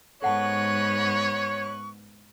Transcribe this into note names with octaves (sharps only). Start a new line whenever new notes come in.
G#2 B3 A4 C#5 F#5 A5 C#6 F#6